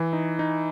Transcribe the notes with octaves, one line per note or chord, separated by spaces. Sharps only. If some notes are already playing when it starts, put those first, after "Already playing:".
Already playing: E3
D#4
D#4